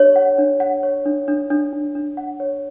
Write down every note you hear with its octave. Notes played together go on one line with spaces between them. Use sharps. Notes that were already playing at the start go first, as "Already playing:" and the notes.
Already playing: D4 G4 C#5
F#5
D4
F#5
C#5
D4
D4
D4
D4
D4
F#5
C#5